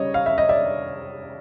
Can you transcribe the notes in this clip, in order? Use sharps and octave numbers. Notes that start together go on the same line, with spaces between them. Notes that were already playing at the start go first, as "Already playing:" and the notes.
Already playing: C#3 G3 C#5 D#5
F5
E5
D#5
D5 E5